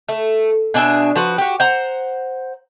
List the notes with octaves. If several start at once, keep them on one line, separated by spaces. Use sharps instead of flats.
A3
B2 D4 G#4 E5
F3 F#4 B4
F#4 G4
C5 F#5 A#5